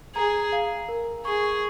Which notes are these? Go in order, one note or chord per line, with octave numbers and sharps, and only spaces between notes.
G#4 A#5
F5
A#4
G#4 C#6